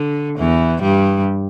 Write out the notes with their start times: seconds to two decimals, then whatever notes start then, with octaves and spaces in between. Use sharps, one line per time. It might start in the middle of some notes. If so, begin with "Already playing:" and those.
Already playing: D3
0.38 E2 E3
0.81 G2 G3